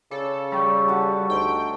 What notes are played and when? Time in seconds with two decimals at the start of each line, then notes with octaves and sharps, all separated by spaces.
0.11 C#3 A4 D5
0.52 G3 C#6 E6
0.88 F#4 A4 A5
1.30 D2 D#4 G5 C6